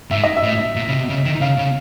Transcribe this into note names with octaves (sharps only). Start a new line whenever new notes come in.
G#2 E5
D#5
E5
A2
A#2
C#3
C3
C#3
D#3
C#3 F5
C#3